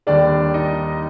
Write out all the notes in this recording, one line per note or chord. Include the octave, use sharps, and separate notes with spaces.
D#2 D#3 G3 D4 D5
D#4 D#5